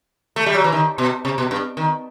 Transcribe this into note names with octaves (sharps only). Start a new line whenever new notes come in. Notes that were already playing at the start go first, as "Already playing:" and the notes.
A3
G3
F#3
E3
D#3
B2
C3
B2
G2
D#3